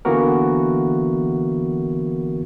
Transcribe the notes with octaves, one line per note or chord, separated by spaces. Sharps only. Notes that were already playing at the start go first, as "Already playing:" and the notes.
D3 E3 A#3 B3 F#4 A#4